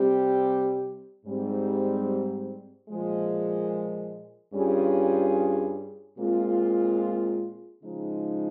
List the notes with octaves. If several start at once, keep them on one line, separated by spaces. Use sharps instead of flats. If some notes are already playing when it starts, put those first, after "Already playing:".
Already playing: C3 G3 C4 G4
G#2 G3 C4
A#2 F3 G#3
G2 G3 C#4 F4 G#4
A#2 G#3 C4 F4
C#3 F3 G#3 D#4